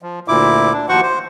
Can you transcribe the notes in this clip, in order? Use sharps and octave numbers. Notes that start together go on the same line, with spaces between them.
F3
D2 A#2 E4 D6
D4
D#2 F3 F#4 C5 F#5 C#6
C5